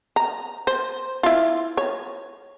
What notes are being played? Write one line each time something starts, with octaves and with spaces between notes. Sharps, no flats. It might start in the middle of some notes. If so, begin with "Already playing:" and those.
A#5
C5
E4 F4
C#5